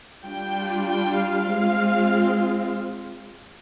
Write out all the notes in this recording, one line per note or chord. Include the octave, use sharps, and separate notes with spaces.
G3 D4 F4 G5
G5
F5
G#3 C4 F4